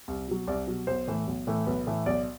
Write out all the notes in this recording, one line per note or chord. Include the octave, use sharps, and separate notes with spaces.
C2
B2 F#3
C2 D5
B2 F#3
B1 C5
A2 E3 A3
B1
A2 E3 A3
B1 B4
A2 E3 A3
B1 D5